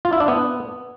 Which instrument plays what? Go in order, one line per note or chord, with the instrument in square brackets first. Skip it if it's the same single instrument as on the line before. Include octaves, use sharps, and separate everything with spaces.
[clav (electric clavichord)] F4
E4
D4
B3